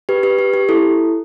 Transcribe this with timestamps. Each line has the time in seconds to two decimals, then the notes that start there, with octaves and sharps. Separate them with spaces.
0.09 G4 B4
0.23 G4 B4
0.39 G4
0.54 G4
0.69 E4 A4